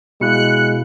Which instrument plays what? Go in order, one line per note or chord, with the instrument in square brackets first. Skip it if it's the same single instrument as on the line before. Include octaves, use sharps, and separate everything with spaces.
[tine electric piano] B2 E4 F5 [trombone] G#3 [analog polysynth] F#6 C#7